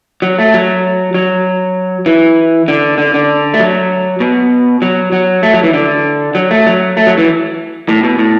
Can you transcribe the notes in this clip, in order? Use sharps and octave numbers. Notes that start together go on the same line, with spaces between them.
F#3
A3
F#3
F#3
E3
D3
D3
D3
A3
F#3
B2
F#3
F#3
A3
F#3
E3
D3
F#3
A3
F#3
A3
F#3
E3
A2
B2
A2